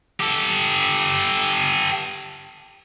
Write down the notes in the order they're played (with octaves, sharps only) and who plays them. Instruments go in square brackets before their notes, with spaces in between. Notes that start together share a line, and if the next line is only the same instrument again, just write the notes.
[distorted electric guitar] G4 A4